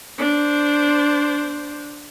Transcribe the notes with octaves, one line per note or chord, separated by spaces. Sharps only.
D4 C5